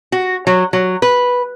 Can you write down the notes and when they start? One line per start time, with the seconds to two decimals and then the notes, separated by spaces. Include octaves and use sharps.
0.12 F#4
0.47 F#3
0.73 F#3
1.02 B4